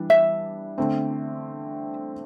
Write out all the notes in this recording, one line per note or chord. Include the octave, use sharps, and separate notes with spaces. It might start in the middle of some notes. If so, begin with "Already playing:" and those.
Already playing: E3 G3 D4
E5
D3 A3 C4